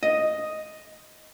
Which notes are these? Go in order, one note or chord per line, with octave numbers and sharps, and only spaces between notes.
D#5